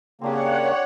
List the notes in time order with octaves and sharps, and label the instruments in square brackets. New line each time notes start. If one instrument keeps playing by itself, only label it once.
[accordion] C#3 A#3 [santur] C4 D4 G4 [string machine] C#5 F#5